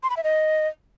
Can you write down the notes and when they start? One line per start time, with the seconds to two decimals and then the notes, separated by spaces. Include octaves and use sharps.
0.03 C6
0.10 B5
0.17 E5
0.24 D#5